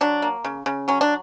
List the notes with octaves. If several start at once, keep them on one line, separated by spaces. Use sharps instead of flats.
F#3 D4
A#3
C#3
C#3
F#3 C#4
D4